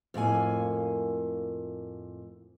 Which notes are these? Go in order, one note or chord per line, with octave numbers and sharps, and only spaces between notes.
F2 A2 A#3 G#5